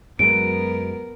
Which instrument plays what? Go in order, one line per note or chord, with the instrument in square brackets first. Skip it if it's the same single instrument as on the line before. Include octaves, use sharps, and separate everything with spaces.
[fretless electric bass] F#2 F#3 G#3 [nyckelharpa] B3 A#4 [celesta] D7